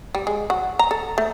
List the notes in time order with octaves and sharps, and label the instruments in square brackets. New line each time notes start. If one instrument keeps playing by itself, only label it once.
[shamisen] G3
G#3
F#4
A#5
A4
A3